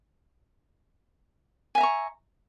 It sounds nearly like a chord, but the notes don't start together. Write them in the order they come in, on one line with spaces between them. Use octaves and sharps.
G#5 E5 A#5 C#6